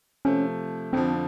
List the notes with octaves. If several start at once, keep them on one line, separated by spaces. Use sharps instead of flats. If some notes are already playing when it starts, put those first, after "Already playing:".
C3 F3 A3 C#4
F2 D3 F3 C4